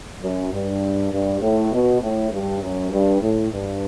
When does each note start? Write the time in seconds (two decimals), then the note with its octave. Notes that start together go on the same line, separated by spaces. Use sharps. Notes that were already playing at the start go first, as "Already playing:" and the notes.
0.21 F#2
0.52 G2
1.12 G2
1.41 A2
1.72 B2
2.01 A2
2.31 G2
2.61 F#2
2.91 G2
3.21 A2
3.52 G2